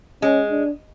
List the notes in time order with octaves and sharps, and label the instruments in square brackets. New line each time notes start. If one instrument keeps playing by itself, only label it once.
[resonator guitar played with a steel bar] G#3 [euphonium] C#4
[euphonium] D4